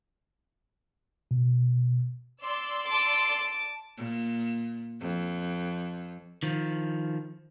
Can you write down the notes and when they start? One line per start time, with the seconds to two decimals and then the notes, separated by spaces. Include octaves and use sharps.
1.31 B2
2.41 D5 C6 E6
2.87 A5 D6
3.97 A#2
5.01 F2
6.43 D#3 F3